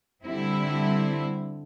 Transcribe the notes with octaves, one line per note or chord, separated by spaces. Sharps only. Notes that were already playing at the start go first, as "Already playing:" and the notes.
D3 G3 C4 E4